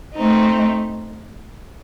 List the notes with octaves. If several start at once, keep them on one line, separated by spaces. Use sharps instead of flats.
A3 C4 D#4